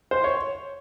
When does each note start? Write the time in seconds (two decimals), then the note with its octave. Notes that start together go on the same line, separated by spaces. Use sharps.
0.11 C5
0.24 C#5